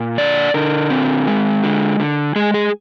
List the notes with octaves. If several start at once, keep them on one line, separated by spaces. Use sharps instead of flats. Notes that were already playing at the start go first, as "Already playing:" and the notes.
Already playing: A#2
D3 D5
D3 A#4
C4
G#3
D3
D3
G#3 G#4
G#4